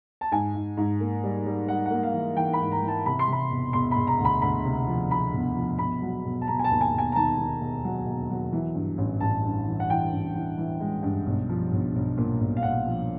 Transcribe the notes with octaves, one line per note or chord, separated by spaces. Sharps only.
A5
G#2 G#5
G#2
G#2
A#3
G3
G3
G3 F#5
F#5
A#3
F5
E3
E3 G5
B5
G#2
A#5
E3
A5
C3 B5
C6
C3
B5
E1
E1 C6
B5
E1
A#5
D2
B5
D2 B5
C3
F3
F3 B5
E1
F3
E1 B5
F#3
E1
A5
E1 A#5
G#5
A5
D#2
G#5
E1
G#5
A#5
D#3 A5
D#3
E1
F#3
E1
F#3
E3
G2
A1
A1 A5
G2
E3
F#5
E3 G5
A1
E3
E3
G#3
G2
B1
F3
B1
B1
A#2
B1
F5
B1 F#5
F3